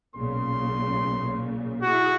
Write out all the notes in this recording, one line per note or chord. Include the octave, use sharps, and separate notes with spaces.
B1 A#2 C#3 C6
E4 F#4 G#4